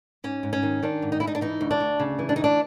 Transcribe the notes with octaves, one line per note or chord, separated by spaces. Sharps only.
G#2 C#4
G#2
C#4
D#3
D#3 D4
G#2
D#4
G#2 E4
D#4
D4
E3 D#4
D2
D4
D2
C#3
E3
D4
D2 D#4
D4